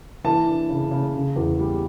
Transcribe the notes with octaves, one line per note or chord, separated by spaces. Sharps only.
E3 A5
D4
C#3
C#3
C#3
E2
G3